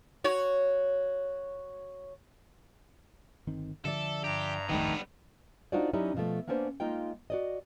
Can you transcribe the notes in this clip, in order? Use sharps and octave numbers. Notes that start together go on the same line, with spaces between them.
F#4 C#5
G1 D#3 C4
D3 F3 A4 D5 E5
G2 G4 A#5
D1 G1 F2 D#3 G3 A3 B3
D4 D#4 F4 F#4 C5 D5
F#3 C#4 D#4 E4 G4 D5
B2 F3 A3
A#3 B3 C#4 D4 B4 C5
G#3 A#3 D#4 F4 G5
F#4 D5 D#5